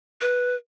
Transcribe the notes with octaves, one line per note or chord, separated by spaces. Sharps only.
B4